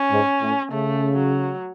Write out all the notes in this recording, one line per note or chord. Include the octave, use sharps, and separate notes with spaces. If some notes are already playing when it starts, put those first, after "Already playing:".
Already playing: C#4
G#2
A2
C#3 A3
F#3